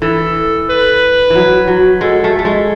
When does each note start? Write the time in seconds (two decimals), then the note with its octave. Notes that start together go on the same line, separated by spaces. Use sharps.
0.02 E3 A4
0.69 B4
1.30 E3 F#3
1.67 F#3
2.01 G#3 A4
2.24 A3
2.39 A3
2.45 G#3